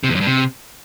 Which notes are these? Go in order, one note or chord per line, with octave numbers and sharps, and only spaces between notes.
C3
E2
F#2
G2
C3